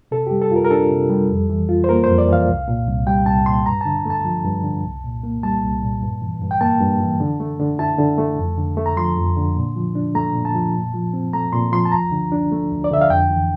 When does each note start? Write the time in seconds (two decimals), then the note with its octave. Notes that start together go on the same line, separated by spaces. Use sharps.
0.11 C3 A4
0.27 G3 G4
0.42 A4
0.51 F4 A#4
0.64 A#4
0.70 D4 A4
0.90 C3
1.09 G3
1.30 F2
1.49 E3
1.69 F4
1.84 C5
1.89 A#3 A#4
2.04 F2 C5
2.18 D5
2.28 E3 F5
2.48 C2
2.68 A#2
2.88 C2
3.07 G3 G5
3.26 C2 A5
3.46 A#2 C6
3.66 G2 A#5
3.81 D3 A5
4.06 A3 A5
4.24 F3
4.45 G2
4.64 D3
4.84 C2
5.04 A#2
5.23 A#3
5.43 G3 A5
5.63 C2
5.82 A#2
6.02 G2
6.22 E3
6.41 G2
6.51 G5
6.61 A#3 A5
6.80 G2
7.00 E3
7.20 D3
7.40 A3
7.60 D3
7.79 E4 A5
7.98 D3
8.18 A3
8.38 F2
8.58 D3
8.77 A3
8.86 A#5
8.97 F3 C6
9.17 F2
9.37 D3
9.56 A#2
9.76 F3
9.95 D4
10.15 A3 A#5
10.35 A#2
10.45 A5
10.54 F3
10.74 A#2
10.94 F3
11.13 C4
11.33 A3 A#5
11.53 A#2 C6
11.72 F3 C6
11.85 A5
11.92 D2 A#5
12.12 D3
12.32 D4
12.52 A3
12.71 D2
12.84 D5
12.91 D3 E5
13.01 F5
13.10 F2 G5
13.30 E3